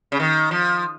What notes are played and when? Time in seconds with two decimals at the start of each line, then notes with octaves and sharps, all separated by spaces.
0.12 C#3
0.20 D#3
0.51 F3